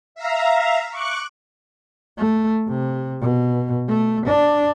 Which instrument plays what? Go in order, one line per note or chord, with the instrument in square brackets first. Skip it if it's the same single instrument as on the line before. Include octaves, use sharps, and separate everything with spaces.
[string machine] E5 F5 A#5
C#6 D6 F#6
[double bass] A3
C3
B2
A3
D4